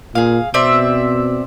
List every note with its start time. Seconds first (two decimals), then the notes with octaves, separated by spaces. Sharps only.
0.15 A#2 G#4 F5
0.54 B2 C4 D5 E5